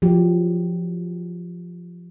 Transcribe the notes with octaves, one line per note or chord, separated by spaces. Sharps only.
F3 F#3 G4